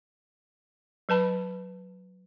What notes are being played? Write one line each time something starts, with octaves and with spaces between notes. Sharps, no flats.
F#3 B4 A5 B5